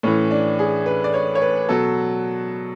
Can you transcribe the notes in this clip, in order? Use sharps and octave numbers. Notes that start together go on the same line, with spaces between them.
A2 E3 C#4
D4
G#4
B4
D5
C#5
C#5
B4
B2 F#3 A4